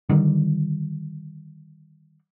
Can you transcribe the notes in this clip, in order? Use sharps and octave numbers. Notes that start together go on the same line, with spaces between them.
D3 D#3 G3